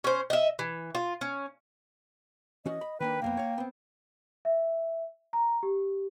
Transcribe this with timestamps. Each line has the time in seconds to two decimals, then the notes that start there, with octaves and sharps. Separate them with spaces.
0.04 C#4 C5
0.30 D#5 E5
0.59 E3
0.95 F4
1.21 C#4
2.66 E3 C#4 F#4 D#5
2.81 B5
3.00 D#3 A#3 D4 B4 G5
3.22 B1 F2 A#3 B3
3.37 C#5 F5
3.58 B3 C4
4.45 E5
5.33 A#5
5.63 G4